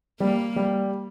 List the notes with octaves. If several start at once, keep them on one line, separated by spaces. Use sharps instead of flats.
G3 A#3
G3